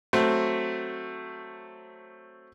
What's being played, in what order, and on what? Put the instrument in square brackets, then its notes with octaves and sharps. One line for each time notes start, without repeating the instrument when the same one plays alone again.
[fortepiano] F#3 A3 C4